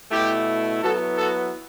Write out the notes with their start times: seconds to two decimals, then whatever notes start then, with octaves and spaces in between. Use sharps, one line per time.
0.11 B2 A3 E4 G4
0.83 F#3 B3 E4 F#4 A4
1.18 F#4 A4